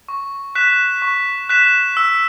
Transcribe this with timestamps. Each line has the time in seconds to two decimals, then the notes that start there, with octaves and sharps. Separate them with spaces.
0.09 C#6
0.55 F#6 B6 E7
1.02 C#6
1.49 F#6 B6 E7
1.97 E6